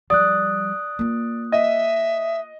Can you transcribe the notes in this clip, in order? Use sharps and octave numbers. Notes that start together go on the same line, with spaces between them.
F3 G3 D5 D#6 F#6
A#3 F4
D#5 E5